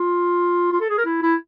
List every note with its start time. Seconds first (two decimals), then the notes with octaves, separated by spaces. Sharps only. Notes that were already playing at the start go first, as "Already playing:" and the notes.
Already playing: F4
0.72 F4
0.81 A4
0.90 G#4
0.98 A#4
1.05 E4
1.23 E4